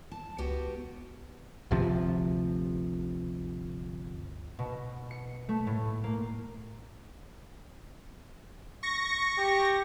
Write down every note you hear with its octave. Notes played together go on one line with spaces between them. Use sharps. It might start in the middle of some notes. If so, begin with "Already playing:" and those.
A5
C#2 B3 F#4 G4
G1 D2 C3 F3
B2
C#7
A3
A2
A#3
C#6 A#6
G4